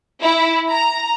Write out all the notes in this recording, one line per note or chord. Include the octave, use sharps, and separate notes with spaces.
E4
A#5